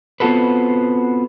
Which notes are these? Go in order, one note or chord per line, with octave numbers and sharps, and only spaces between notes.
B3 C4 F4 F#4 A4 B4